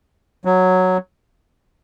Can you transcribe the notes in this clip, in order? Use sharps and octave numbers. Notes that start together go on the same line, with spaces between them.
F#3